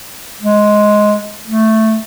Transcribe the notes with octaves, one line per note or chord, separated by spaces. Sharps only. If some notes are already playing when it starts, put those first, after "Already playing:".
G#3
A3